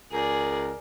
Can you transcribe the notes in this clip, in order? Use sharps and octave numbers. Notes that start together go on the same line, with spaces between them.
C#2 G#4 A#4 D5